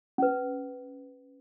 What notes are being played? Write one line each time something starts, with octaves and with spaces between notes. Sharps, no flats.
C#4 B4